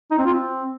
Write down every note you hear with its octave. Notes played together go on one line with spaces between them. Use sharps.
D#4
C4
F4
C4